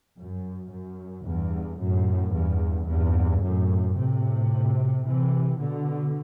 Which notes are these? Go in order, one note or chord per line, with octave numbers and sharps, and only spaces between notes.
F#2
F#2
E2 G2
F#2 A2
E2 G2
E2 G2
F#2 A2
A2 C3
C3 E3
B2 D3